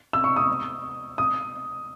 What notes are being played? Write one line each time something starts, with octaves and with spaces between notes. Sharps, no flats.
E6
C#6
D#6
D#6